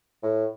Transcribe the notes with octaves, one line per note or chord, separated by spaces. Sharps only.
A2